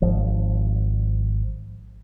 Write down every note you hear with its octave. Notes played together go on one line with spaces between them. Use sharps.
G#1 F3